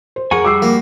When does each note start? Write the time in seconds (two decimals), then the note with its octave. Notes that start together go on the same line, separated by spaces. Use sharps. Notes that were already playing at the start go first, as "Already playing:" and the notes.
0.16 C5
0.31 F2 G#4 A#4 F#5 G#5 C#6
0.45 G3 F#4 D6 E6 C7
0.62 F3 A#3